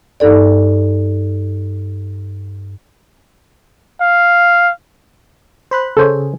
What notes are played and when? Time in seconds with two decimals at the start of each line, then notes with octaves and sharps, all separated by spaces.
0.20 G2 D#4 A4 D5
4.01 F5
5.71 C5 B5 F#6
5.97 C#3 G#4 A4 C5 C#5